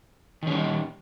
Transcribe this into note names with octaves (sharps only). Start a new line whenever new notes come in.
D#3 G3 C#4